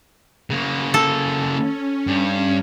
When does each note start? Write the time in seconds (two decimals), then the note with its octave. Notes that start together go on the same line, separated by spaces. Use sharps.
0.50 C#3 A#3
0.94 A4
1.55 C#4
2.07 G2